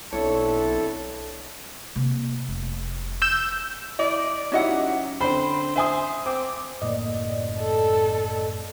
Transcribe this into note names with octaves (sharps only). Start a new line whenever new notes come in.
B1 C4 D4 E4 A4 C#5
C3 A#3
F1
E6 G6 E7
E4 D5 D#5
F#3 C#4 D#4 E4 G4 D#5 F#5
D3 C4 C5 B5
C5 E5 G#5 D#6
C4 D6
F#1 A2 A#3 D5 D#5
A4